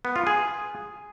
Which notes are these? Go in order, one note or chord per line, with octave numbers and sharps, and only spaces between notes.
B3
F4
G#4